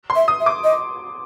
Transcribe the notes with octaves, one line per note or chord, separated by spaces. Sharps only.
C6
E5
D#6
E5
D6
D#5